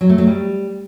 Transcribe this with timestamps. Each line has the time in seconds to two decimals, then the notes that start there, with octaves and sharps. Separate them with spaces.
0.01 F#3
0.09 A3
0.18 F#3
0.27 G3